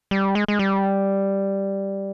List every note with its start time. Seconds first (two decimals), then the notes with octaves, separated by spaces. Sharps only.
0.11 G3
0.35 G#3
0.48 G#3
0.59 G3